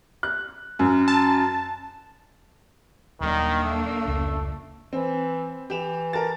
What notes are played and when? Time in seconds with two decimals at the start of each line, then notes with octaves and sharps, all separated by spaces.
0.23 F#6
0.79 F#2
1.08 A5
3.20 D#1 D#3 F#3 A#3 D4
3.64 A3
4.05 F1 C#2
4.93 E3 C4
5.70 E3 G4 E7 F7
6.13 A#4 A5 A6